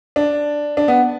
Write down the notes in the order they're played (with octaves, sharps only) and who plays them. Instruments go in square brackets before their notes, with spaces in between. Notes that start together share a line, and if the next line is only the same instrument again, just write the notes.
[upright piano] D4
D4
B3